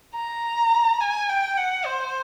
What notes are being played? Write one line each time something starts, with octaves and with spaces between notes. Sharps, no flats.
A#5
G#5
G5
F#5
C5